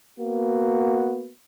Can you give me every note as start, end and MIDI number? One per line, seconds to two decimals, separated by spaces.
0.19 1.31 58
0.19 1.31 59
0.19 1.31 66